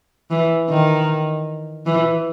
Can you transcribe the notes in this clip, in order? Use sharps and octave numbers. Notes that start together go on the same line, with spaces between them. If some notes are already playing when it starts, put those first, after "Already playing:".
E3
D#3
E3